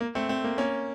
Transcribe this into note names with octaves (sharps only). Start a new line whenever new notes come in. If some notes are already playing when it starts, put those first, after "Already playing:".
A#3
A3 C4
A3 C4
A#3
A#3 C#4